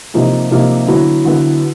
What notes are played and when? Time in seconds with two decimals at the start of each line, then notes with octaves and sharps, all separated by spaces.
0.14 C3 F3 A#3 D#4
0.51 C3 F3 A#3 D#4
0.87 D3 F#3 B3 E4
1.25 D3 F#3 B3 E4